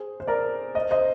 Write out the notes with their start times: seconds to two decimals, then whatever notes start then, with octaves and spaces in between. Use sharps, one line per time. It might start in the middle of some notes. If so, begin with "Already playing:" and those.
Already playing: G#4 C5
0.20 C5
0.27 A#4 D5
0.75 C5 D#5
0.91 C5 D#5